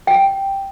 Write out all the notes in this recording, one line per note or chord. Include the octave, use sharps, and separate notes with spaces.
G5